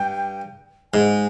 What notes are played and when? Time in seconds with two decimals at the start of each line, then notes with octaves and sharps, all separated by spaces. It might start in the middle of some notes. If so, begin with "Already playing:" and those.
Already playing: G2 G5
0.93 G#2 G#5